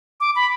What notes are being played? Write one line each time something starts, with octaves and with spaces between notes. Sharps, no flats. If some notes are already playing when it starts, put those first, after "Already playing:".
D6
B5